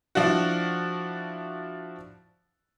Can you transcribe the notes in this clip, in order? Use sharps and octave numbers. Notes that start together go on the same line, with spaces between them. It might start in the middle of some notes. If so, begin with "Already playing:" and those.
F3 D4 E4 F#4